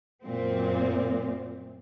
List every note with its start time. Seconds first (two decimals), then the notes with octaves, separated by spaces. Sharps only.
0.23 F#2 A#2 C4